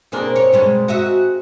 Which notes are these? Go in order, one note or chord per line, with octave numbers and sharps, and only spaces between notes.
B2 A#3 C4 D4 G#4 A#4
C#5
B2 G3 G#3
F#4 D#5 E5